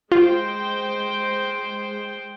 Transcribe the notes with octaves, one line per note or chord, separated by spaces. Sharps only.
G#3 F4 C5 G5